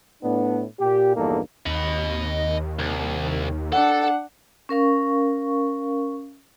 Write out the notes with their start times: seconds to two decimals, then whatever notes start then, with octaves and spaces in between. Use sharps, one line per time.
0.23 A2 B3 D4
0.80 A#2 G4
1.16 A#1 E2 G2 A#3 D#4 A4
1.66 D#2 D#5 B5
2.79 C2
3.73 D4 A4 F#5
4.69 C#4 A#4 F5 C#6